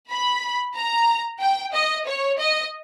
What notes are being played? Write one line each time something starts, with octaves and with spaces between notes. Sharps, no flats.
B5
A#5
G5
D#5
C#5
D#5